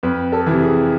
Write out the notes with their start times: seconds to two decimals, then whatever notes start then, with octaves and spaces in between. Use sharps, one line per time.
0.03 F2 B4
0.32 A4
0.46 C3 E3
0.62 G#4